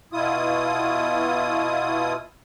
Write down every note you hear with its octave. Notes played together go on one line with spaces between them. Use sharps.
B2 E4 F4 D#6